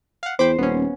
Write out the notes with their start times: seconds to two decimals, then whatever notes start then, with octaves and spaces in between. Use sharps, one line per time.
0.23 F5 F#5
0.39 E2 C5 G5 B5 D6
0.59 D#1 B3 C#4